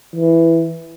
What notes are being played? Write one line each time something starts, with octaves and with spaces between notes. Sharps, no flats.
E3